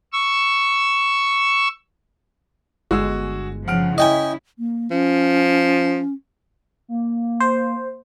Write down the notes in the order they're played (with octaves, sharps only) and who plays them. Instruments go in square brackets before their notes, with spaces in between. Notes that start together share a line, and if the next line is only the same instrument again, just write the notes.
[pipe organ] C#6 E6
[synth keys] G1 G#3 [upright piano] F#4 G#4 E6
[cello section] C#3 F3 [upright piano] F#5 F6 D7
[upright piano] C#4 [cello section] E4 [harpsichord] D#5 G5 G#5
[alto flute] A#3
[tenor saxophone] F3 [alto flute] C#4
[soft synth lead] A#3
[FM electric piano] C5